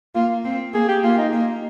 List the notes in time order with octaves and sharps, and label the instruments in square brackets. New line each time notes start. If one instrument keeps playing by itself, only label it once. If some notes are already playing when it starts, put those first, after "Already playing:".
[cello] A#3 [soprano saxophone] F4
[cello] C4
[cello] A#3 [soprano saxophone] G#4
[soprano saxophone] G4
[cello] A#3 [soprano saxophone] F4
[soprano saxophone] D#4
[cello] A#3